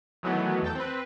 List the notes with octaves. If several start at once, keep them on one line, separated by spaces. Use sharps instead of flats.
D#3 E3 F#3 A3 B3
E2 A4 G5
C4 B4